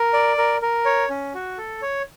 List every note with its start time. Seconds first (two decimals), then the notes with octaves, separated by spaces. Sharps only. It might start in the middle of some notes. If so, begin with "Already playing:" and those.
Already playing: A#4
0.13 D5
0.38 A#4
0.62 A#4
0.85 C#5
1.09 C#4
1.34 F#4
1.58 A4
1.82 C#5